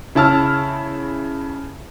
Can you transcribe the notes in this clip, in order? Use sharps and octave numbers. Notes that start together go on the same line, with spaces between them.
C#3 E4 C#5 A5 E6 F6